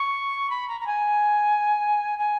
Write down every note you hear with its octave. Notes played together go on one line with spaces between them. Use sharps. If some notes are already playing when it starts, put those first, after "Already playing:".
Already playing: C#6
B5
A#5
A#5
G#5
G#5